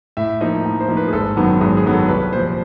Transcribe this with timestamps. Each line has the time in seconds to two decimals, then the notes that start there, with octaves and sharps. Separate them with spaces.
0.17 A2 E5
0.41 F3 A#3 D#4 D#5
0.65 A2
0.81 C5
0.88 F3 A#3 D#4
0.97 B4
1.08 G#4
1.13 G#1 A4
1.37 F#2 D#3 F#3 B3
1.61 G#1 G#4
1.77 G#4
1.85 F#2 D#3 F#3 B3
1.93 A4
2.09 C2 B4
2.33 A#2 F3 C5